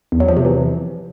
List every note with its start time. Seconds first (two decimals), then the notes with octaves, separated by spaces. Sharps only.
0.12 E2
0.20 F#3
0.28 F3
0.37 C3
0.45 E3